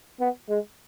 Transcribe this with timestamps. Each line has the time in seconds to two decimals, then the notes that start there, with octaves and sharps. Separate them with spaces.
0.20 B3
0.49 G#3